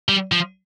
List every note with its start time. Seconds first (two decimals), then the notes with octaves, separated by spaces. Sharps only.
0.09 G3
0.32 F3